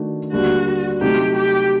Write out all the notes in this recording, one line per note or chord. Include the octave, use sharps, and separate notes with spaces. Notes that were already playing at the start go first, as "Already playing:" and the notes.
Already playing: D#3 A3 D4 F#4
D#2 D3 G3 F#4
C3 F#3 A3 D#4 G4
G4